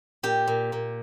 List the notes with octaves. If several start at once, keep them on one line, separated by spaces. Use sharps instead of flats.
A#2 G4
A#2
A#2